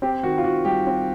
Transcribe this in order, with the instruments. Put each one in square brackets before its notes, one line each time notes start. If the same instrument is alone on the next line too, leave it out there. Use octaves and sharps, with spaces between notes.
[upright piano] C4 G4
D#3 F#4
F4
D#3 F#4
G3 G4
C4